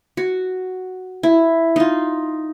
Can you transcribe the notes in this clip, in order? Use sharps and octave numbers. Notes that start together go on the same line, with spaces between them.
F#4
E4
D#4 F4